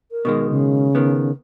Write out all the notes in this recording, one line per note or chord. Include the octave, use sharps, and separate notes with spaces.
A#4
B2 D#3 G#3
C#3
D#3 B3